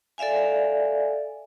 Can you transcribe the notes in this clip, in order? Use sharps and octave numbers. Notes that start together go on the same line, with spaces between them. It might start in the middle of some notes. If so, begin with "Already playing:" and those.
A4 D5 E5 F5 G#5